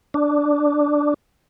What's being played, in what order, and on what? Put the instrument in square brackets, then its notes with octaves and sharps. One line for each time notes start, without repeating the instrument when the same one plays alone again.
[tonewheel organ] D4